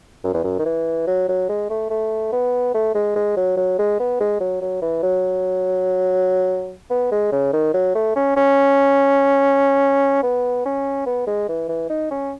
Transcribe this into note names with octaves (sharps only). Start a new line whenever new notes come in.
F#2
E2
F#2
D#3
E3
F#3
F#3
G#3
A3
A3
B3
A3
G#3
G#3
F#3
F#3
G#3
B3
G#3
F#3
F#3
E3
F#3
B3
G#3
C#3
D#3
F#3
A3
C#4
C#4
B3
C#4
B3
G#3
E3
E3
D#4
C#4